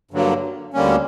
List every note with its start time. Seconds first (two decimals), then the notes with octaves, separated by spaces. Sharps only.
0.11 G2 D3 F#3 A#3
0.74 D2 D3 G3 A#3 C#4